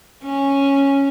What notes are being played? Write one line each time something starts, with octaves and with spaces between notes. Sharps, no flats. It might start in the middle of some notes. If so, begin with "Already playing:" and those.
C#4